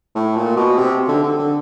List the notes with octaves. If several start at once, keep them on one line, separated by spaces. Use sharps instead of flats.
A2
A#2
B2
C3
D3
D3
D3